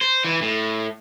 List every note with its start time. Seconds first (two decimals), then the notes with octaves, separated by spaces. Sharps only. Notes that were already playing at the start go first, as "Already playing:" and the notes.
0.01 C5
0.25 E3
0.42 A2